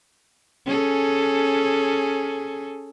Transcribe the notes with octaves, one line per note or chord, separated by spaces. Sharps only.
C#4 G#4 A4